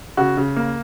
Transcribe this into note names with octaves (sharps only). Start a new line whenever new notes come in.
C#3 F#4
C#3
A#3